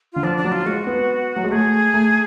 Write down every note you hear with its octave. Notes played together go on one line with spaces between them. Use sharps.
D3 F4
F3 D4
D4
F#3
F4
G#3 F#4
B3
F#3
G#3
A3 G#4
A3